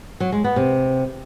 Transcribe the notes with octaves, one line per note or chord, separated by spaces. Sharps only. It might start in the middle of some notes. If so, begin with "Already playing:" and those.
F#3
G#3
B3
C3